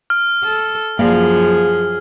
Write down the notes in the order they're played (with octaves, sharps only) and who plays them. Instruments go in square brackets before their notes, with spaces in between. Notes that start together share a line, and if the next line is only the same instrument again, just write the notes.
[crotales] F6
[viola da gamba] A4
[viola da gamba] F#2 F3 [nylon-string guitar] A#3 D5 F5 [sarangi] G#4